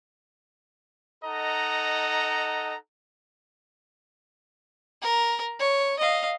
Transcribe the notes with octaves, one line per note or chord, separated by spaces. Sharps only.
D#4 A4 D#5 F#5 A#5
A#4
C#5
D#5 F5